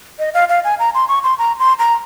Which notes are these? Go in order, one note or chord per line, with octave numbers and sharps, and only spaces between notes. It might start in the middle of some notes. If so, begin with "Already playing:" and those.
D#5
F5
F5
G#5
A#5
C6
C#6
C6
A#5
C6
A#5